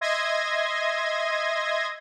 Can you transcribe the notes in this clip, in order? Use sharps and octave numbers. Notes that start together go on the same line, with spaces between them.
D#5 E5 C6 G#6 A#6 D#7